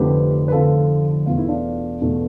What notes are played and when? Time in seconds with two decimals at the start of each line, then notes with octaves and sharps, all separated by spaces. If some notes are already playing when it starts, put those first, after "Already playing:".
Already playing: F1 F2 D3 A3 G4 B4
0.48 B4
0.52 F1 F2 D3 A3 F4 A4
1.26 E2 B2 A3 F4
1.38 E4
1.48 D4 F4
2.01 E2 B2 A3